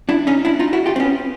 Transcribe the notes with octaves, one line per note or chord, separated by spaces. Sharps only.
D4 E4
C#4 D#4
D4 E4
D#4 F4
E4 F#4
F4 G4
C4
B3 C#4